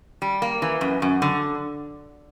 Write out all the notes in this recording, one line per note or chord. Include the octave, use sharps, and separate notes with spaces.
G3
A#3
E3
F#2
F#2
D3